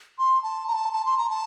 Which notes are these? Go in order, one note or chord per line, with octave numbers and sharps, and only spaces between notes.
C6
A5
A#5
A5
A5
C6
A#5
A5